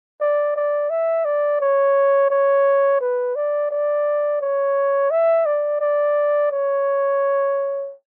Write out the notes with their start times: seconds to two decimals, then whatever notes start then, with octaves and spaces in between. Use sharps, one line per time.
0.21 D5
0.55 D5
0.90 E5
1.25 D5
1.60 C#5
2.31 C#5
3.00 B4
3.35 D5
3.71 D5
4.41 C#5
5.11 E5
5.46 D5
5.81 D5
6.51 C#5